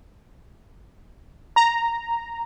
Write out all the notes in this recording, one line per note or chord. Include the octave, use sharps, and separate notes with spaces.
A#5